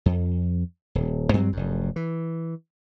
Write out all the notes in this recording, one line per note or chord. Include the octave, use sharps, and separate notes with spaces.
F2
D#1
G2 F#3 C4
F1 F#2
E3